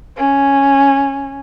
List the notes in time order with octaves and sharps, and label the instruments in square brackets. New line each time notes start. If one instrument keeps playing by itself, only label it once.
[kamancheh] C#4